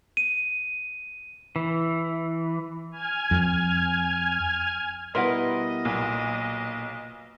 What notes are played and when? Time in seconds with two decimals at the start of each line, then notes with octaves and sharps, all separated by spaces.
0.17 D#7
1.56 E3
2.91 G#5 F6 G#6
3.31 F2
5.15 B2 G3 E4 A#4 B4 D#5 F#5 C6
5.85 B1 A#2